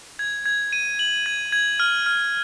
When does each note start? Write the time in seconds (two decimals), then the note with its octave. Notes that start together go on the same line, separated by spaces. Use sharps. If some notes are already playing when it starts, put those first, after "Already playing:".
0.19 G#6
0.46 G#6
0.73 D#7
0.99 F#7
1.26 G#6
1.52 G#6
1.80 F6
2.06 F6